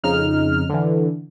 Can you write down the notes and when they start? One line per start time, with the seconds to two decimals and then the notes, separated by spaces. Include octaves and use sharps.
0.03 F2 C#3 D#4 F6
0.69 D3 E3